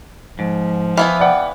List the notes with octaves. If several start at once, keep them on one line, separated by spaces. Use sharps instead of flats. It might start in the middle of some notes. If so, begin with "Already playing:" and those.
G#2 F3
E3 B3 E4 F5
D5 F#5 G5